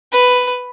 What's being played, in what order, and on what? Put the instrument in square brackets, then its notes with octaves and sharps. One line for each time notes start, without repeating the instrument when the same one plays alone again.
[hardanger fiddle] B4